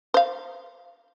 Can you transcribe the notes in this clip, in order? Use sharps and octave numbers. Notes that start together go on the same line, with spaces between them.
C5 F5